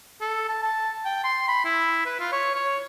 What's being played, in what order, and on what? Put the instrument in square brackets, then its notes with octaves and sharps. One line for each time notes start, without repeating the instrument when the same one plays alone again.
[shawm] A4
A5
A5
G5
C6
B5
E4
B4
F4
C#5
C#5